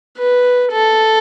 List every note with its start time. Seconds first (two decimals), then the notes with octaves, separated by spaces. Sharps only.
0.18 B4
0.72 A4